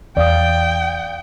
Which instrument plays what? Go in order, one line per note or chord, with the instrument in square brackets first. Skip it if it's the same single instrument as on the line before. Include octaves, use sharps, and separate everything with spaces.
[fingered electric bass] E2 [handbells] D5 F5 D#6 [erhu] G5